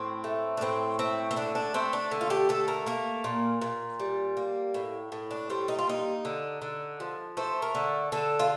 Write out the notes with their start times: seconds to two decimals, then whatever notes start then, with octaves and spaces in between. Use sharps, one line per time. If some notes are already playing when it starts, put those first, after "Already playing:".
Already playing: A2 C4
0.24 A3
0.57 D4
0.61 A2 C4
0.99 A3 C4
1.31 C4
1.36 D3 D4
1.55 D4
1.74 A3 C4
1.93 D4
2.11 D3
2.21 F4
2.30 G4
2.49 A3 A4
2.68 A#4
2.86 A#3 A#4
3.24 A#2
3.61 A#2
3.99 G3
4.37 A#3
4.74 A2
5.12 A2
5.31 D4
5.50 G3 C4
5.68 D#4
5.79 F4
5.87 A#3 D#4
6.25 D3
6.62 D3
7.00 F3
7.37 A3 C5
7.62 A#4
7.75 D3
8.12 D3 A4
8.39 F4